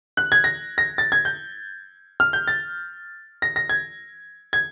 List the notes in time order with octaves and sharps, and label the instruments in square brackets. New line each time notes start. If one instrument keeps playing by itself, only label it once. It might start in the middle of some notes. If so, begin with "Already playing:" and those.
[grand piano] F#6
G#6
A#6
A#6
A6
G#6
G6
F6
G6
A6
A#6
A#6
G#6
G#6